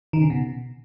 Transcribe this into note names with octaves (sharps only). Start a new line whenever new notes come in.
D#3
C#3
B2